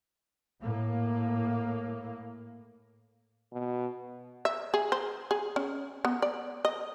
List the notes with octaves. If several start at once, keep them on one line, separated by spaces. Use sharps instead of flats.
A2 A#3
B2
E5
G#4
C5
G#4
C#4
B3
D5
D#5